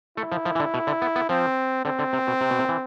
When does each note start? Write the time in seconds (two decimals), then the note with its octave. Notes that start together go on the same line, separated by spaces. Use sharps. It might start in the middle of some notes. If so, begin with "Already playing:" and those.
0.17 A3 E4
0.32 F3
0.45 F3
0.55 E3
0.60 D3
0.74 B2
0.87 D3
1.02 B3
1.16 B3
1.29 F3 C4
1.85 D3 C4
1.99 D3
2.13 C3
2.27 B2
2.41 C3
2.50 B2
2.59 C3
2.69 E3